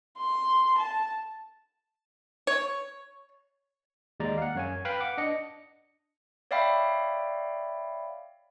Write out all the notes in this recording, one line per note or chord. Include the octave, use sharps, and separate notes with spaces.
C6
A5
C#5
D#2 G#3 D5 A#5
F5 F#5
F#2 C#5 G#5
B4 F5 G5 B5
F#5 D6
D4 D#5 C#7
C#5 D5 E5 F5 G5 B5